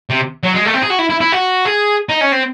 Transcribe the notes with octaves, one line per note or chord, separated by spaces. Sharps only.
C3
F#3
G#3
A3
C4
G#4
F#4
E4
E4
E4
F#4
G#4
D#4
C#4
C4